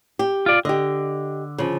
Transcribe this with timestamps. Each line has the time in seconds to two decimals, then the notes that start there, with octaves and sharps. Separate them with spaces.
0.19 G4
0.46 F4 D5
0.65 D3 G4 D#5
1.58 C#3 F3